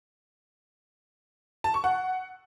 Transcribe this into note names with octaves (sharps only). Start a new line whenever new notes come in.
A5
C#6
F#5